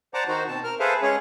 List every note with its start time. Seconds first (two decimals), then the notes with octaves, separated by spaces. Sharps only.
0.14 C5 D5 F#5 A5 A#5 D6
0.28 D#3 D#4 F#4 C5
0.48 B2 C4 A5
0.64 A#4 F6
0.80 G#4 A4 B4 C5 E5 F5
1.02 G#3 C#4 G#4 C#5